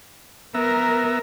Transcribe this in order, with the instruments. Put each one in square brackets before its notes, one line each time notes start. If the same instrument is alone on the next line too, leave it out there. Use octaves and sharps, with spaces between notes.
[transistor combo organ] B3 E5 A#5 [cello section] A#4